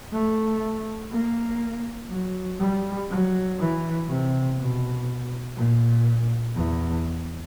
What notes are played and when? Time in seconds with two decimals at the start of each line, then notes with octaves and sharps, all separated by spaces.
0.12 A3
1.12 A#3
2.10 F#3
2.60 G3
3.10 F#3
3.58 E3
4.08 C3
4.58 B2
5.57 A#2
6.55 E2